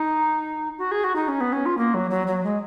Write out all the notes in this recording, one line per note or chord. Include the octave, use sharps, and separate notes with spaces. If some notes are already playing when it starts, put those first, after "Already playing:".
Already playing: D#4
F#4
G#4
F#4
D#4
C#4
B3
C#4
F4
A#3
F#3
F#3
F#3
G#3